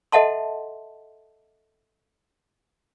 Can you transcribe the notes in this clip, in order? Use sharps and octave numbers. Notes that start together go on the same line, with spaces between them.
A4 D#5 E5 F#5 A5 C6